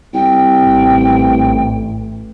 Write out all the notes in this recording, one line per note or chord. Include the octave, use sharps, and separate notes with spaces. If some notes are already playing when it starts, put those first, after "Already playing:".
C2 G5
A1